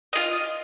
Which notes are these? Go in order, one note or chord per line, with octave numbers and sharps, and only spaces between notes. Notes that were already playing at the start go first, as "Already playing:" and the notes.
F4 G#4 D#5